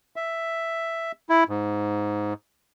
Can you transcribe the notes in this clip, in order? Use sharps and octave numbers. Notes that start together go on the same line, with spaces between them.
E5
E4
G#2